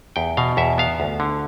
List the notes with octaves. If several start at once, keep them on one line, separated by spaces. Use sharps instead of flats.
E2 G5
B2 F5
E2 E5
B3 F5
D2
D3